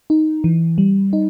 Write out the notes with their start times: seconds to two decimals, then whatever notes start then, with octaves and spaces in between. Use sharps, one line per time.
0.10 D#4
0.44 E3
0.78 G3
1.13 D#4